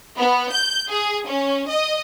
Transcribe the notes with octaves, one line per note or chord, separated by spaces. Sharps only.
B3
G6
G#4
C#4
D#5